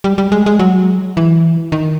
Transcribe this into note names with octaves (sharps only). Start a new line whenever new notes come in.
G3
G3
G#3
G#3
F#3
E3
D#3